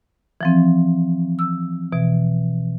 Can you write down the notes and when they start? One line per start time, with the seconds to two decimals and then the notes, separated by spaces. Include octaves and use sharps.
0.41 E3 F3 C4
1.39 E6
1.92 B2 E3